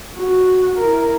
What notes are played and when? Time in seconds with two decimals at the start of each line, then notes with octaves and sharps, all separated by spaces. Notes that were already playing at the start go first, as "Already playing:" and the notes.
0.17 F#4
0.78 E4 A#4